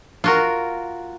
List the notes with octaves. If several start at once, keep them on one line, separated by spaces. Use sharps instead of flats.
F4 F#4 A#4